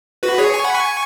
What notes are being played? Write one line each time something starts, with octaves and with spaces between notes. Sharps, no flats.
F#4 B4
G#4 C#5
G#5 C#6
F#5 B5
G#5 C#6